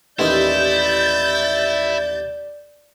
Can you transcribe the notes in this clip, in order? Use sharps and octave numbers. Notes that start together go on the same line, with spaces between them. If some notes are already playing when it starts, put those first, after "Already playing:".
A1 D#2 D#4 E4 D5 G6 A6